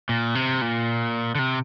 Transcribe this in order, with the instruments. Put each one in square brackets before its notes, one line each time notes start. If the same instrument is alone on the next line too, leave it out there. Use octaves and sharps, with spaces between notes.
[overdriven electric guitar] A#2
C3
A#2
D3
C3